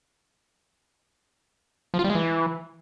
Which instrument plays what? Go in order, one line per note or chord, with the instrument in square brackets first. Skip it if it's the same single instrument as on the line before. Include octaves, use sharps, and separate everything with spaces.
[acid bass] F3
F4
G3
G#3
E3